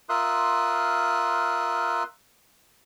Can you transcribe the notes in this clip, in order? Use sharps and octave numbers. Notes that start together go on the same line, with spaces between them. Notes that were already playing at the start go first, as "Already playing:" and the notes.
F4 A#4 E5 C6 D#6 F#6